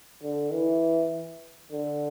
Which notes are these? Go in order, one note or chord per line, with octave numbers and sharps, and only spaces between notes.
D3
E3
D3